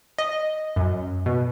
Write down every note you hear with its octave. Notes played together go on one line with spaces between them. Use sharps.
D#5
F#2
B2